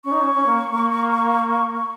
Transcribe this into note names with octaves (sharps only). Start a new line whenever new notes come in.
C#4 C#6
D#4
C#4
C#4
A#3
A#3